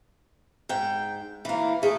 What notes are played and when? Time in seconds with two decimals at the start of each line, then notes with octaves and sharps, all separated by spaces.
0.69 G#2 G5
1.45 E3 A#3
1.83 A3 G#4